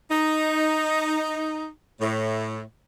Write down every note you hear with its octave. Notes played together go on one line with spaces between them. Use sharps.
D#4
A2